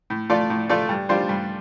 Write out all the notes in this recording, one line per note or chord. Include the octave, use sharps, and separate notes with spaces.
A2
A3 F4 A4 D5
A2
A3 F4 A4 D5
G2
G3 D4 F4 C5
G2